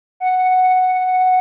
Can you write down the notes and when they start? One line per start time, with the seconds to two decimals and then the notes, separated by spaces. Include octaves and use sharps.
0.20 F#5